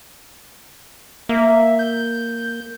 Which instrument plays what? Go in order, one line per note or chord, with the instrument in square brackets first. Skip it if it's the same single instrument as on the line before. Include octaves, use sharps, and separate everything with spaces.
[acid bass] A#3 [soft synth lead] E5
[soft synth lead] G6